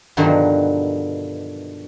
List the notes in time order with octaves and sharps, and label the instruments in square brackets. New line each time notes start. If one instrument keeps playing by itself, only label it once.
[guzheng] G2 B2 D3 D#3 F3 F#3